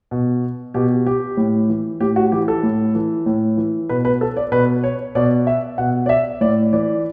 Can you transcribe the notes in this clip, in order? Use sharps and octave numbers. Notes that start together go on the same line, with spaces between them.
B2
B2 G4
G4
A2
E3
A2 G4
F#4
E3 G4
A4
A2
E3
A2
E3
B2 B4
B4
A4
D5
B2 B4
C#5
B2 D5
E5
B2 F#5
D5
E5
A2 D5
E3 D5